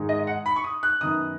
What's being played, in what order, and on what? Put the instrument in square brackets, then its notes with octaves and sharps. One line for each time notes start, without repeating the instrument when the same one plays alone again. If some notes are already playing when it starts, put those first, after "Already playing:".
Already playing: [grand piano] G#2 D#3 G#3
D#5
D#5
F#5
B5
C#6
D#6
F#6
F#2 D#3 B3 D#4 D#6